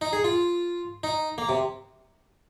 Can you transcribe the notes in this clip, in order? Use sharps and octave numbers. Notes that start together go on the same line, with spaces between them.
D#4
G#4
F4
D#4
A#3
C3